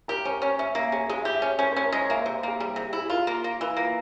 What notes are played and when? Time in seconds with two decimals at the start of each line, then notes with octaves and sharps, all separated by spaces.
0.08 G4 A#4
0.25 C#4 C5
0.42 C#4 C#5
0.59 C#4 E5
0.75 A#3 E5
0.92 C#4 G#4
1.09 G#3 G#4
1.22 G4 E5
1.35 E5
1.42 C#4
1.47 C#5
1.59 C#4 C5
1.72 C#4 C5
1.84 A#4
1.92 G#3 C#5
2.10 A#3 E5
2.22 C3 C5
2.35 C5
2.43 A#3 G#4
2.60 G3 G#4
2.72 C3 G4
2.85 G4
2.93 E4 G#4
3.10 F4 A#4
3.27 A#3
3.44 A#3
3.60 E3 A#4
3.77 A#3 F4